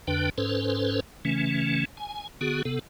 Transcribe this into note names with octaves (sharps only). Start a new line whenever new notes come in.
F2 D3 D4 B4 G5
G#2 C#4 A4 B4 C5
C#3 E3 A3 C#4
G#5
D3 B3 F#4 G#4
C3 B3 A4